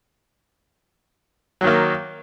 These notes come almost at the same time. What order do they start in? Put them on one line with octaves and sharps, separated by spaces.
F#3 D#3 A#3